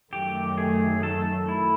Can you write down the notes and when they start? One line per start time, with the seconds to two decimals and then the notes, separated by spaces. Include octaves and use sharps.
0.13 F#2 D#3 F#3 A3 G4
0.58 G#4
1.03 A4
1.49 E4